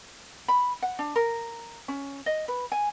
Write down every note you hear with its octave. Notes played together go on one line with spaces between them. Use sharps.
B5
F#5
D4
A#4
C#4
D#5
B4
G#5